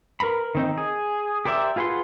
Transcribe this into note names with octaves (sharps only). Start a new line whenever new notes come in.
A#4 B4 A#5 B5
D#3 C4 D#4
G#4
G4 A#4 C5 D5 E5
F4 G#4 B4 F#5 C6